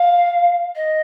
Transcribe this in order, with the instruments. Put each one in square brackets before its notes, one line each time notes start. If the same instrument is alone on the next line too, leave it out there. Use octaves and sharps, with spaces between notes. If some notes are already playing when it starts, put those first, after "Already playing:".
Already playing: [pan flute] F5
D#5